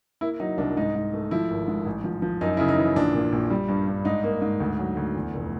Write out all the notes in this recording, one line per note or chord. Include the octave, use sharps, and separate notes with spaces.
A#3 E4
F#3 D#4
C2 D4
G#2 D#4
G#2
A3
F3 E4
G#1
G#2
A1
F3
F3
F#2 D#4
C#3 E4
D#4
E3
A#1 D4
A#2
A#1
G3
G2
G2
G#2 D#4
A#3
G#2
D2
F#3
D2
E2
F1